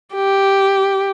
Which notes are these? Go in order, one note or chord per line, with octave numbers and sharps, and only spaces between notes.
G4